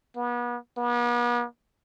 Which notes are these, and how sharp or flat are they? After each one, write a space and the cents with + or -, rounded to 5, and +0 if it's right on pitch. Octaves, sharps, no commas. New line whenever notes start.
B3 -35
B3 -45